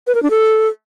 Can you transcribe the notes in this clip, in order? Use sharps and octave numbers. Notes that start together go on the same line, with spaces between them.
B4
A#4
D4
A4